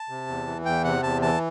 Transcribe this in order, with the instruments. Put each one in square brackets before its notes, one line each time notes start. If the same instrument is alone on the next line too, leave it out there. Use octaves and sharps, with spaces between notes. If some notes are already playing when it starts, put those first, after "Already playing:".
Already playing: [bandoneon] A5
C3
E2
E3
E2 G5
C3 F#5
E2 A5
E3 A5